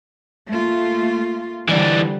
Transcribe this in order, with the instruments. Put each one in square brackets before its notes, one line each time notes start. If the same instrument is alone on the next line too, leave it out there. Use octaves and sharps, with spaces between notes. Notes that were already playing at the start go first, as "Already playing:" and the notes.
[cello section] A3 A#3 F4
[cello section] D3 F3 G3 [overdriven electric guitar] E3 D4